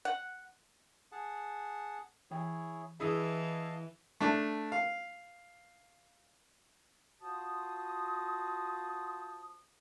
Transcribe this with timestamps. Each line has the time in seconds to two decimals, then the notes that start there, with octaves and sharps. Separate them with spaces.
0.05 F#5
1.12 G#4 F#5 A5
2.31 E3 E4 G#4 C#5 G5
3.00 E3 E4 G#4 D#5 F5 A5 D#6
4.21 A3 D4
4.72 F5
7.21 F4 F#4 C5 A5 D#6